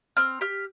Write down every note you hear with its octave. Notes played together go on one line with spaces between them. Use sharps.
C4 F6
G4 F6